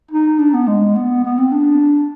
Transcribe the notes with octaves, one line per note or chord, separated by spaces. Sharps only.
D#4
D4
B3
G#3
B3
B3
C4
D4